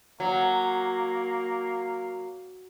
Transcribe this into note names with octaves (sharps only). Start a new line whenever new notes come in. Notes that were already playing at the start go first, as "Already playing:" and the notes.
F#3 A#3